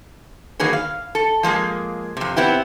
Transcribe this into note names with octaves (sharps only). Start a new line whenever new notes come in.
D#3 F#3 A#3 G#4 B4
F5
A4
F3 G#3 A#3 G#4
F2 C3
B3 C4 E4 G4